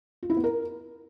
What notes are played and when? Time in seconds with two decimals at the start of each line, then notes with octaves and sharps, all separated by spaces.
0.23 F4
0.30 E4
0.37 B3
0.44 A#4